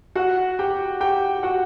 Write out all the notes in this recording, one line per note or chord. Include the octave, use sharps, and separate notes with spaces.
F#4 F#5
G4 G5
G4 G5
F#4 F#5